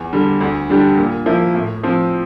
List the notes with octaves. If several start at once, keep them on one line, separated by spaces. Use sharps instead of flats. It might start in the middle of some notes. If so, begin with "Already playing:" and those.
Already playing: E2
D3 G3
D2
D3 G3 D4 G4
A#2
F3 A#3 E4
A2
F3 C4